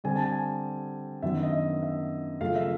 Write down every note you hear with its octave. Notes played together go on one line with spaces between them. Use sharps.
D3 G3 C4 G#5
A5
G#5
F#2 D#3 F#3 B3 D4 E5
D#5
E5
E5
F#2 C#3 F3 A3 F5
E5